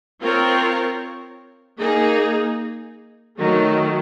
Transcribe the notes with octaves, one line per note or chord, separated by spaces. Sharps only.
C4 F4 A#4 C#5
A#3 D#4 G#4
D#3 F#3 A3